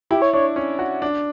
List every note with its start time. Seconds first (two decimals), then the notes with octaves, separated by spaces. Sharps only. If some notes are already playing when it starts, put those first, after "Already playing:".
0.10 E4 G4
0.22 C#5
0.33 D4 C#5
0.56 C#4
0.79 F#4
1.02 D4